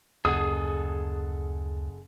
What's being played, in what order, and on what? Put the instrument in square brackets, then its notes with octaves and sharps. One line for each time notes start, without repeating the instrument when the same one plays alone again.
[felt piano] F#1 F#5 [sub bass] D2 [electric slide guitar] G#4 A4 [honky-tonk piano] D#6